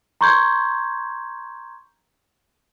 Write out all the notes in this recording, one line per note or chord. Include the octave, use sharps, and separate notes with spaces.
A#5 C6 C#6 G6 G#6